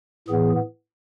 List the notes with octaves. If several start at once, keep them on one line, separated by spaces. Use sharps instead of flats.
A2 E3 B3 G#4